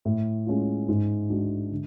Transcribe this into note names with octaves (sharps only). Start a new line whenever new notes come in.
A2
G#3 C#4 F4
G#2
G#3 D4 F#4
D3